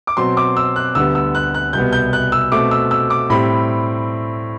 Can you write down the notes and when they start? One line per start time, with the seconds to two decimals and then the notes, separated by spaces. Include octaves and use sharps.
0.07 D6
0.17 B2 F#3 C4 C6
0.37 D6
0.57 E6
0.76 F#6
0.95 D2 D3 G3 B3 E6
1.15 E6
1.35 F#6
1.54 F#6
1.73 C2 B2 G3 B3 G6
1.93 G6
2.13 F#6
2.32 E6
2.52 B2 A3 C4 D6
2.71 E6
2.91 E6
3.10 D6
3.30 A2 G3 C4 B5